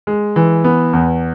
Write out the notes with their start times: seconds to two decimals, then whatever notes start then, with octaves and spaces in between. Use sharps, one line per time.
0.07 G#3
0.36 E3
0.64 B3
0.93 E2